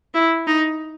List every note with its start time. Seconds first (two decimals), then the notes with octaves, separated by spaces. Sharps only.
0.14 E4
0.47 D#4